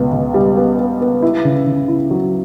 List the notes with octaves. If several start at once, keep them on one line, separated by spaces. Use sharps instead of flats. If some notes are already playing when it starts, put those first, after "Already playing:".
Already playing: C#2 B2 B3
C#2
G3
B3
B3
B3
E4
C#3
C#3
E4
F#3